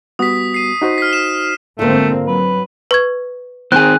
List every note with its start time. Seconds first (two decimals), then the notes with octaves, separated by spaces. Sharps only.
0.19 G3 B3 F#4 D#6 B6
0.54 C7 D#7
0.82 D#4 F#4 C5
0.98 F6 B6
1.13 F6 E7
1.79 G#2 D3 A3 A#3 C4 F4
2.27 F#3 B4
2.91 B4 C#6 G#6
3.72 D#3 C4 G#4 G5 F#6